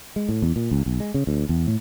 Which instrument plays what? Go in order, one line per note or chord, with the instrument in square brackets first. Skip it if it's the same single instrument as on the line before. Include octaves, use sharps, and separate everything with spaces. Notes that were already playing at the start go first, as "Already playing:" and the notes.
[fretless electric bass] G#3
A2
E2
A#2
C#2
B1
G#3
C#3
D2
E2
A2